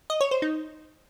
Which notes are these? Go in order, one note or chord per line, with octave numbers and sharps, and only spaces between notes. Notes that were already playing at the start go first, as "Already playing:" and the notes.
D#5
C#5
C5
D#4